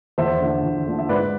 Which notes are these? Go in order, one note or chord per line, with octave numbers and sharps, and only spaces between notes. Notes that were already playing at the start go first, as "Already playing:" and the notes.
E2 C5 E5
D3 F3
E2
D3 F3
E5
G#2 B4 D5